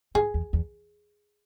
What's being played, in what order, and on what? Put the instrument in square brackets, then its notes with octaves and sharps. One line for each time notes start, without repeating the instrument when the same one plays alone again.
[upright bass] G#2 [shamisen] G#4
[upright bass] E2
E2